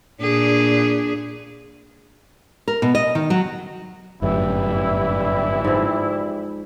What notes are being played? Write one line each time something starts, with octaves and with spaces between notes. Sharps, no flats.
A#2 D4 G#4
A#4
B2
D#5
D#3
F#3
G1 F#2 A2 E3 G3 E4
G#2 F3